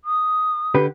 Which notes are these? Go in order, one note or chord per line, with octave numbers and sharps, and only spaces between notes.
D#6
D3 G4 B4